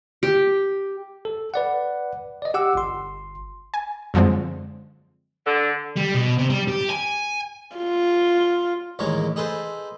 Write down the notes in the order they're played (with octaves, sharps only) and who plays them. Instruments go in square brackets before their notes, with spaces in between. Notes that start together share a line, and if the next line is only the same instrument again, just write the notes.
[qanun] G4
[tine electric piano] A4
B4 D5 F#5
D5 D#5
G4 F#5 D6 E6
G1 C6
[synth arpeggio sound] G#5
F#2 D3 F3 G#3 C4
[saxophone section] D3
[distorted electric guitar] G3
B2
C3
G3
G4
G#5
[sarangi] F4
[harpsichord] A1 D#2 G#3 A#4 C#5
D#4 G#4 A4 B4 C5